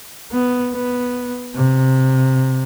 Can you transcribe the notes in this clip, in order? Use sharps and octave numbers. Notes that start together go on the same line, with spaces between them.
B3
B3
C3